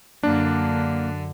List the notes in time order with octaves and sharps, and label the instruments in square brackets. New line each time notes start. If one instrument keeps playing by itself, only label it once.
[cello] F#2 D3 [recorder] A#3 [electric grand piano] D4